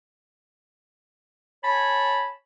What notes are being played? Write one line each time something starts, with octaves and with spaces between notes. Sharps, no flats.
C#5 G#5 A5 B5